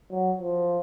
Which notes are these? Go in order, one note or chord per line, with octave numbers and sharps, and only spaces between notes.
F#3
F3